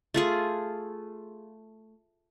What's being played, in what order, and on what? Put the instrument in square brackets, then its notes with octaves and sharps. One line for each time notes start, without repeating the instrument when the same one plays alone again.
[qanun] A3 F4 G#4